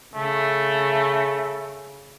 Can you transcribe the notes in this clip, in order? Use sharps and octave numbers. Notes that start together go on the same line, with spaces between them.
C#3 A3